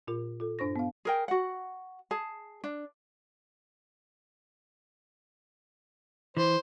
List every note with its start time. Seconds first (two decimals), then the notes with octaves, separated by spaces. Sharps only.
0.08 A#2 F4 A#4
0.40 F4 A4
0.59 G2 D4 C5 C#6 A#6
0.76 B3 F5
1.05 G#4 A#4 G5
1.28 F#4 F#5
2.11 G#4 A5
2.64 D4
6.37 E3 C5